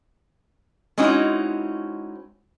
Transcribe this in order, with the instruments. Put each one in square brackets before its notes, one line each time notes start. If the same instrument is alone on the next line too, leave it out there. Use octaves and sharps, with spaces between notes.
[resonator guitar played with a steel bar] G#3 C4 C#4 D#4 E4 F#4